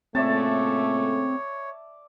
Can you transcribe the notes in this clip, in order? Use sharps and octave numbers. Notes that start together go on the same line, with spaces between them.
A#2 C#3 A3 C4 C#5 D5 E5 A5